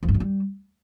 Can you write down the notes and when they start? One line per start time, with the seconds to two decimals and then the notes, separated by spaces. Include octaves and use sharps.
0.03 F2
0.09 G2
0.14 F2
0.20 G3